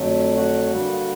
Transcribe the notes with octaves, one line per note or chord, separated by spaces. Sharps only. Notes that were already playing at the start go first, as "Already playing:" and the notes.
Already playing: F2 D3 F#3 A3
F#4 F#5
G2 D3 G3 A#3